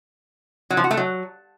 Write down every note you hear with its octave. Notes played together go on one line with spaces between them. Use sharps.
F#3
F3
F#4
A3
F#3